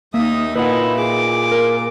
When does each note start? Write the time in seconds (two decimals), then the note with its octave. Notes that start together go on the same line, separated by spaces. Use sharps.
0.14 D#2 A#3 D#4 E5 D#6
0.56 A#2 D#4 E4 B4 D#5 F#5
0.97 G#4 D6
1.52 A#4